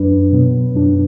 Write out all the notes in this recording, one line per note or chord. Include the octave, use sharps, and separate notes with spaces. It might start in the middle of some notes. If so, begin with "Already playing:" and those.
Already playing: F#2 F#3 D4 B4
B2 F#3 B3
F#2 F#3 D4